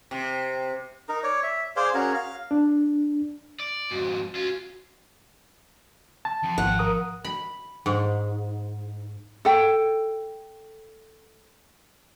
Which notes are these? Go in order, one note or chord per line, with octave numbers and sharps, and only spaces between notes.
C3
D#4 A#4
C#5 D5
E5
G#4 C5 D5 F5
C#4 F#4 G#4 A#4
F5
D4
D5
F2 G#2 F#4
C#4 F4 F#4
A5
F2
G#1 F#5
A#4 D#6
B5
G#2
A4 G5